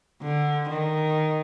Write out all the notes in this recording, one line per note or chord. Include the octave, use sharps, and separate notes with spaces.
D3
D#3